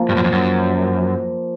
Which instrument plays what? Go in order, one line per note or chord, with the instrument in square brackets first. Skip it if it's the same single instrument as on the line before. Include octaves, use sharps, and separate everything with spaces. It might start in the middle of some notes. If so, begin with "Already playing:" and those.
Already playing: [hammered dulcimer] F3 A#3
[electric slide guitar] G2
F#2
F2
F#2